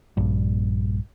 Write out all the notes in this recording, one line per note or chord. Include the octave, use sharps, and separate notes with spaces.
A#1 G2